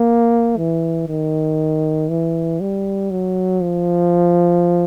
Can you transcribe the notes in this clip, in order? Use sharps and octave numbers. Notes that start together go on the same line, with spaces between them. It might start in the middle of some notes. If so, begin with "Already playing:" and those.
Already playing: A#3
E3
D#3
E3
G3
F#3
F3